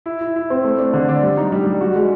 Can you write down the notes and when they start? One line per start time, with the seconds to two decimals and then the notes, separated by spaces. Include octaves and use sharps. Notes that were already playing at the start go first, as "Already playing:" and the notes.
0.06 E4
0.21 E4
0.36 E4
0.50 C4
0.64 A3
0.78 D4
0.94 D3
1.09 D4
1.23 G3
1.37 D#4
1.52 G3
1.67 G3
1.81 F#4
1.95 G#3